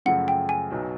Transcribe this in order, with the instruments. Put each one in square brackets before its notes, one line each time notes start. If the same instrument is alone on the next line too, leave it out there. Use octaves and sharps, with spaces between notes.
[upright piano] F#2 C#3 F3 A3 [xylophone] F#5
[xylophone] G5
G#5
[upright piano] B1 B2 F#3